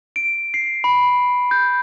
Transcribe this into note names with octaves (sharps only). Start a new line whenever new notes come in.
D7
C7
B5
G6